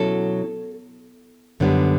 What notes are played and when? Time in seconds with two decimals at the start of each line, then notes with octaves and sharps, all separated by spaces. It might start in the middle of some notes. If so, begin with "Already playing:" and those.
Already playing: B2 F#3 C#4 E4 A4
1.60 F#2 D3 G3 B3